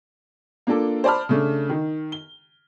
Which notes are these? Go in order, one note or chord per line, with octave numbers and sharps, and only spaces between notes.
A#3 D4 F4 A4
C5 D5 A5 B5 F6
C#3 A3 D4
D#3
G7